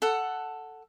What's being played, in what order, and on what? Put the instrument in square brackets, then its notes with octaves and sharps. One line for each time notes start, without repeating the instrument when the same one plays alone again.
[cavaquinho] A4 F#5